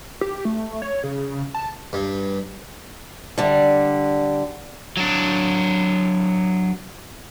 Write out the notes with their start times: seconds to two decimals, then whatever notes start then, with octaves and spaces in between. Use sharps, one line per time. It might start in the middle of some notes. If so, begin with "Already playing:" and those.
0.21 G4
0.45 A3
0.82 C#5
1.04 C#3
1.55 A5
1.93 G2
3.38 D3 G3
4.97 F#3 D4